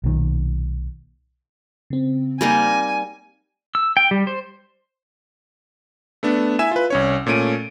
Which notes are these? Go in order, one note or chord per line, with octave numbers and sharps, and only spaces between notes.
B1 A#2 D#3
C#3 C4
G3 A#3 D#4 G#5
E6
G5
G3
C5
A3 B3 D4
E4 E5 G#5 E7
F4 B4
C2 C#4 C#5
A#2 A3 C#4 D7 D#7